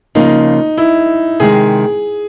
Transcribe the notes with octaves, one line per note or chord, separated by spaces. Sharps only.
C#3 F3 A#3 D#4
E4
C3 D#3 G#3 G#4